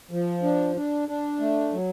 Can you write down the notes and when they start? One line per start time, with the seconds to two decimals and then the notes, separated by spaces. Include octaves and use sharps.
0.11 F3
0.43 D4
0.76 D4
1.08 D4
1.40 A3
1.73 F#3